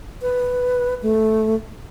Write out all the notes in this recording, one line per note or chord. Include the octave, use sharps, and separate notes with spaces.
B4
A3